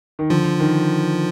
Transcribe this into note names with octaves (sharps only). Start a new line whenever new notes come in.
D#3
D3 F3 F4
D#3